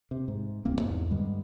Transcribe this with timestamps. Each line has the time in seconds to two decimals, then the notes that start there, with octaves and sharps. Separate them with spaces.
0.11 C3
0.28 G#2
0.65 D1 C2 A#3 C4
0.81 E2 G#2
1.11 G2 D3 G3 G#3